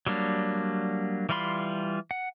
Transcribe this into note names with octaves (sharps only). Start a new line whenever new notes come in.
F#3 G3 A#3 D4
E3 G3 F4 B5 C6
F#5